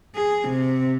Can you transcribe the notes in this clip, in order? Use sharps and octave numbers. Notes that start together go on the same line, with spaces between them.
G#4
C3